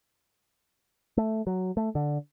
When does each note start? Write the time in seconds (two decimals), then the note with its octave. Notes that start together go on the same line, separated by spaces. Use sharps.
1.17 A3
1.47 F#3
1.77 A3
1.95 D3